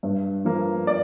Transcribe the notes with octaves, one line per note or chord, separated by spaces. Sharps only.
G2
F3 A#3
D5